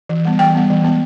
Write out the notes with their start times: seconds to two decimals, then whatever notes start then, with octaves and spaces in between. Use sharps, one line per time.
0.09 E3
0.25 G3 B3
0.39 E3 G5
0.55 G3 B3
0.70 E3
0.84 G#3 B3